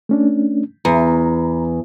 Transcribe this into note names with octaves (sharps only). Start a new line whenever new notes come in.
A3 C#4 D4
E2 A#5